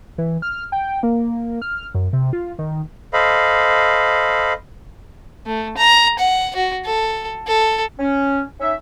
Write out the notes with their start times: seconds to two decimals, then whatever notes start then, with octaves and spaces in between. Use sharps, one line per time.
0.18 E3
0.42 F6
0.72 G5
1.03 A#3
1.62 F6
1.94 F#2
2.13 C3
2.33 F4
2.59 D#3
3.13 A4 C5 D#5 F5 B5
5.46 A3
5.77 A#5
6.19 F#5
6.56 F#4
6.85 A4
7.47 A4
7.99 C#4
8.60 C#4 D#4 E5